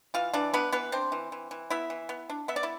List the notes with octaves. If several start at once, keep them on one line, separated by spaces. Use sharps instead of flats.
E3 F4 F5
E3 D4 D5
B3 D4 B4
E3 B3 B4
C4 D4 C5
E3
E3
E3
B3 E4 E5
E3
B3
D4
B3 E5
D5
E4